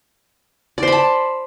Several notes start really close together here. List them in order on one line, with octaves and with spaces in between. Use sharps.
D5 C5 B5 A5